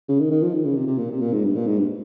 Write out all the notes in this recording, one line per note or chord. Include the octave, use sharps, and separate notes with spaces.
C#3
D#3
D#3
F3
D#3
C#3
C3
C3
A#2
C3
A#2
G#2
G2
A#2
G#2
G2